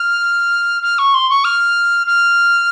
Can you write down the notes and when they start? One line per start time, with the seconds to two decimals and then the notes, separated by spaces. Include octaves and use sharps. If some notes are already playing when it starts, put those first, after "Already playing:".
Already playing: F6
0.82 F6
0.98 C#6
1.14 C6
1.30 C#6
1.44 F6
2.07 F6